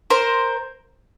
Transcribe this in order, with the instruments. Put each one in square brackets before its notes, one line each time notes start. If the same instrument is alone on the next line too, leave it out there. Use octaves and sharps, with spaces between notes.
[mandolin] A#4 C5